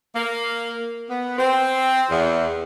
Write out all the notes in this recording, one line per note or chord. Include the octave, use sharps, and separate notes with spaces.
A#3
B3
C4
E2